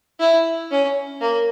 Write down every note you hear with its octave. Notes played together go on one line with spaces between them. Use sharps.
E4
C#4
A#3